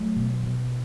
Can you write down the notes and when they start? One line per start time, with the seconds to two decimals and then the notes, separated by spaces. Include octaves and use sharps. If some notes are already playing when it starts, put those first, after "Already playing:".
Already playing: F#3 A3
0.16 B2
0.43 B2